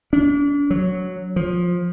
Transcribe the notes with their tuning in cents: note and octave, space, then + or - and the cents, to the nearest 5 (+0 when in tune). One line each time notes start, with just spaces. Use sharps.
D4 -40
F#3 -5
F3 +15